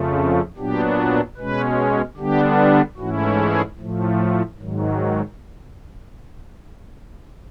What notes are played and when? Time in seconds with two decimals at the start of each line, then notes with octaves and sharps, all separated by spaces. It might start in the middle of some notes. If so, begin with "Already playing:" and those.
Already playing: F2 C#3 F3 A3
0.57 A#2 F#3 B3 D4 G4
1.37 B2 G#3 C#4 B4
2.17 D3 G3 B3 D4 G4
2.97 G#2 E3 A3 C#4 E4 F#4
3.38 G#4
3.78 A2 F3 A3
4.57 G#2 D#3 F#3